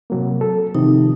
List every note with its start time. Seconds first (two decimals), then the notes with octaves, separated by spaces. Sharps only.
0.10 C3 F#3 A#3
0.41 A4
0.75 C3 D#3 F3 D#4